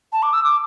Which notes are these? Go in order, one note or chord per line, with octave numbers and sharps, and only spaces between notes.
A5
D6
E6
D6